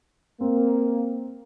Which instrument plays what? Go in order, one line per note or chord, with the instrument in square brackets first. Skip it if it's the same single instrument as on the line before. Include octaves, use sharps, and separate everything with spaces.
[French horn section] A#3 [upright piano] C4